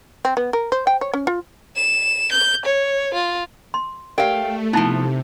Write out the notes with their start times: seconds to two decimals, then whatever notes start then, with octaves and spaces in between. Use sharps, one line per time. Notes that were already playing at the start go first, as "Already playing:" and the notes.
0.25 C4
0.37 B3
0.53 A#4
0.72 C5
0.87 G5
1.01 C#5
1.13 C#4
1.27 F4
1.76 E7
2.32 G6
2.65 C#5
3.14 F4
3.74 C6
4.18 A3 G4 A#4 D5 F5 G5
4.73 C3 F3 B3 D#4 E4 A5